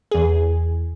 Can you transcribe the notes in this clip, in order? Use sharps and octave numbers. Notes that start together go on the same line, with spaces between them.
E2 G#4